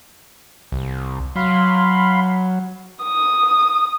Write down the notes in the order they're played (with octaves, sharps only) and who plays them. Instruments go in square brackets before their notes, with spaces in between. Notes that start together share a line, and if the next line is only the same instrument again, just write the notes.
[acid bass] C2
[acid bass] F#3 [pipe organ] F5 B5 C6
[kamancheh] D#6